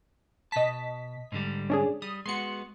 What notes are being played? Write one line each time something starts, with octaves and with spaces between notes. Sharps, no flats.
B2 D#5 A5 B6
G#2 D3 G3
C#4 D4 G#4
G3 D#6
G#3 B3 F#4 C6 C#7